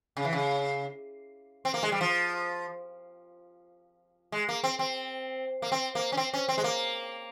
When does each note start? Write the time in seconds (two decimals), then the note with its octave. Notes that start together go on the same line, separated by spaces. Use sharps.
0.17 C#3
0.25 E3
0.33 C#3
1.65 C4
1.74 A#3
1.83 G#3
1.92 G3
2.01 F3
4.32 G#3
4.49 A#3
4.64 C4
4.79 C4
5.62 A#3
5.72 C4
5.95 A#3
6.12 C#4
6.17 C4
6.34 C#4
6.49 C4
6.58 G#3
6.64 A#3